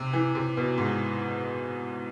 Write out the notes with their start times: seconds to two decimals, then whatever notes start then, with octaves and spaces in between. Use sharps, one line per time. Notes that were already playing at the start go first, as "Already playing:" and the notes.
Already playing: C3
0.13 E3
0.35 C3
0.57 B2
0.78 G#2